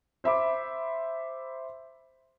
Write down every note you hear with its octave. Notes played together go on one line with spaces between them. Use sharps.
C5 E5 B5 D6